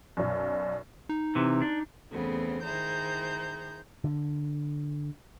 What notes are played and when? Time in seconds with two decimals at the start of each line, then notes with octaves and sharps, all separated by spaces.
0.17 B1 F#2 D5
1.09 D#4
1.35 C3 E3
1.62 D4
2.12 E2 C#3 A3 B3 C4
2.64 D#3 E4 G#4 C5 A#5 G6
4.04 D3